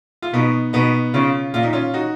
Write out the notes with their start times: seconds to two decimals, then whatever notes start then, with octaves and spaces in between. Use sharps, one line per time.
0.22 F4
0.33 B2 B3 D#4
0.73 B2 B3 D#4
1.14 C#3 C#4 F4
1.54 A#2 F4
1.63 D#4
1.73 C#4 F4
1.94 D#4 F#4